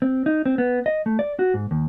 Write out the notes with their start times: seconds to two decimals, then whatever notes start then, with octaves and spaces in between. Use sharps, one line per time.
0.02 C4
0.26 D#4
0.46 C4
0.58 B3
0.86 D#5
1.06 A3
1.19 D5
1.39 F#4
1.54 G#2
1.71 D#2